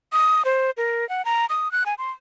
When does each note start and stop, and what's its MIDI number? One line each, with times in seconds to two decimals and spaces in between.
0.13 0.43 87
0.45 0.71 72
0.77 1.08 70
1.09 1.24 78
1.25 1.46 82
1.50 1.71 87
1.72 1.84 90
1.86 1.94 80
1.98 2.11 84